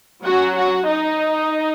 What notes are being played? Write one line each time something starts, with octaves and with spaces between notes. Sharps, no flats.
F#3 C#4 F#4 F#5
F#4 F#5
D#4 D#5